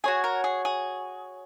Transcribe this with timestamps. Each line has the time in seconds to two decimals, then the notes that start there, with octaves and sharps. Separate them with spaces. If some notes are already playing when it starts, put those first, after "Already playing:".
0.04 F#4 G#4 C#5 G#5
0.24 A#4
0.44 G#4
0.65 G#4